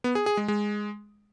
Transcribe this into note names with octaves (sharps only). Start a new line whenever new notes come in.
B3
G#4
G#4
G#3
G#3